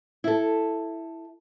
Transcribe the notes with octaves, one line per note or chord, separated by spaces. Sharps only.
E4 A4